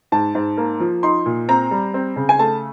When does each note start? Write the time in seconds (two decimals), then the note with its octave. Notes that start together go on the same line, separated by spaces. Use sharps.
0.12 G#2 A5
0.35 G#2
0.58 A#3
0.80 F3
1.03 D#4 C6
1.26 A#2
1.49 C4 A#5
1.71 G3
1.94 C4
2.16 C#3
2.29 G#5
2.39 A3 A5